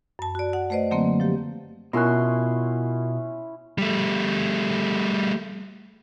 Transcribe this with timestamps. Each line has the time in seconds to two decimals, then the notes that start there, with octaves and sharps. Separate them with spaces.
0.19 F#2 A5
0.35 F#4 D5
0.53 F#5
0.70 A3 B4 C5 D5 D#5
0.91 D3 F#3 A3 A#3 C4
1.20 F3 G4
1.93 B2 C#4 E4 F4 A#4 C6 F#6
3.78 G3 A3